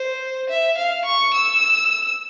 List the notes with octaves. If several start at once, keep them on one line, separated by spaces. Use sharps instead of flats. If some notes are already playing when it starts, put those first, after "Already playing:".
Already playing: C5
E5
F5
C#6
E6